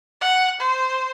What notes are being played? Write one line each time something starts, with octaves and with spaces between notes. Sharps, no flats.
F#5
C5